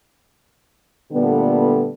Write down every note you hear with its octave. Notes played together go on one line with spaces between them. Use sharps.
A#2 D3 G3 A3 B3